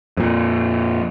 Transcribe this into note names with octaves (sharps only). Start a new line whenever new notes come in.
F2 A#2